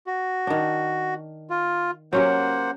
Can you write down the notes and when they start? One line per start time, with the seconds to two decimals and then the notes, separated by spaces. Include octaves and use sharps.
0.07 F#4
0.47 D#3 D4
1.50 F4
2.13 F#3 A#3 C#4 G4 C5 F#5